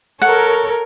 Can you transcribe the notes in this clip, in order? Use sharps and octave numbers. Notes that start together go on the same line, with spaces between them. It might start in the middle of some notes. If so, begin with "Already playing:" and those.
A4 A#4 C#5 F#5